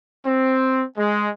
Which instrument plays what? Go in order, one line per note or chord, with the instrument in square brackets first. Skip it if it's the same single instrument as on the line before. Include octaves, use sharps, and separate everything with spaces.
[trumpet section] C4
G#3